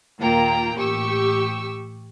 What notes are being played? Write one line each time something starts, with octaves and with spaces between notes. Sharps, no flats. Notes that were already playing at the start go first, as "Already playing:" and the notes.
D#2 A#2 A#3 F4 G5 A#5
A1 G4 C#6 E6